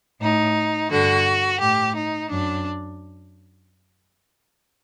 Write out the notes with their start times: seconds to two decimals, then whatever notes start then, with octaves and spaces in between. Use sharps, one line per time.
0.21 A2 D#4
0.90 G2 D3 F#4
1.60 A2 G4
1.95 D#4
2.29 F#2 D4